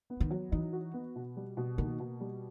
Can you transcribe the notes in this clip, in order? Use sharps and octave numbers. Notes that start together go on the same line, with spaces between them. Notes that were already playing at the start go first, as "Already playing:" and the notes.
B3
D#3
F#3
E3 D#4
F#4
B3
B2
G3
B2
D#3 A#3
B2
G3